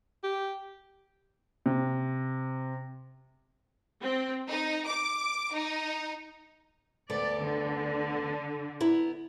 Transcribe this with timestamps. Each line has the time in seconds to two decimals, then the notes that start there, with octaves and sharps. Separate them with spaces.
0.24 G4
1.66 C3
4.01 C4
4.49 D#4
4.87 D6
5.55 D#4
7.10 D2 B3 A4 D5
7.40 D3
8.80 B3 E4 A#5